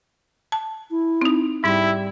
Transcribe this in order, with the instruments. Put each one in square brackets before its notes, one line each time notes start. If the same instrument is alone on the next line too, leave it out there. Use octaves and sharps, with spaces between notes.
[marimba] A5
[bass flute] E4
[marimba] C4 D#4
[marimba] G#2 [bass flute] G3 [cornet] E4